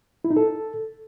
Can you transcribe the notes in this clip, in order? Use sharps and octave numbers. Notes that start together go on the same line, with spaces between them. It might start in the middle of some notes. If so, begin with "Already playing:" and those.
E4
D#4
A4